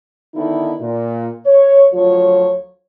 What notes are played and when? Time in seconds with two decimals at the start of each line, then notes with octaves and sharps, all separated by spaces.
0.34 D3 D#3 B3 D#4 E4
0.80 A#2
1.45 C#5
1.92 D2 F3 F#3 F4 C#5